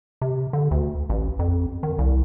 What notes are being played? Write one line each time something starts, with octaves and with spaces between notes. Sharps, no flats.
C3
D3
D2
A1
F2
D#3
C2